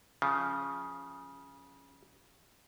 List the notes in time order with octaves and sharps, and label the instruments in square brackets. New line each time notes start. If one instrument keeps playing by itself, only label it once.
[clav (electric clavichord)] C#3 F3